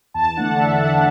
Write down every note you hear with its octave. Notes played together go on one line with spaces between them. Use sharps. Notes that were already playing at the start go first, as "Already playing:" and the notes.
E2 A5
D3 A3 D4 F#5
E2 E5
D3 A3 D4 F#5